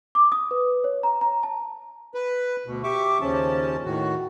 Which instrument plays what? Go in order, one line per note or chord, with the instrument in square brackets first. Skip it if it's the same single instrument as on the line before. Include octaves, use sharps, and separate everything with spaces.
[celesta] D6
D#6
B4
C#5
A#5
A#5
A5
[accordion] B4
D2 B2
G4 E5 C#6 D6
D#2 C#3 F3 C#4 A5
A2 D#3 F#4